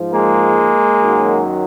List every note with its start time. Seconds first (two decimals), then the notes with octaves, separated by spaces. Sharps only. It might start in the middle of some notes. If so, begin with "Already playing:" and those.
Already playing: G#2 F3
0.13 G#3 A#3
1.00 F#2 D#3 F#3